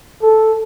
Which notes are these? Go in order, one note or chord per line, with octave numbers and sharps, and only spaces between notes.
A4